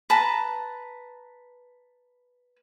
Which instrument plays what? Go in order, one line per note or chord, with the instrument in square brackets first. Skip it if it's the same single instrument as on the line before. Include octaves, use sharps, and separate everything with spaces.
[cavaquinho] B4 A5 A#5